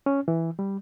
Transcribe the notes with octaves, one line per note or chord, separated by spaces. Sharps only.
C#4
E3
G3